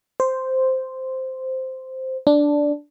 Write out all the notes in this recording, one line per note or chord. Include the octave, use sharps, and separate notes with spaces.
C5
D4